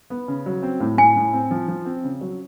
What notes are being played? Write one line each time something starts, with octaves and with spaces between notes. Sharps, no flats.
B3
C#3
F#3
C4
A2
A2 G#5
A2
C4
F3
F3
C4
C#3
F#3